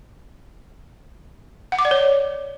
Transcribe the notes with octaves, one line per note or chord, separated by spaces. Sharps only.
F#5
D6
D5
C#5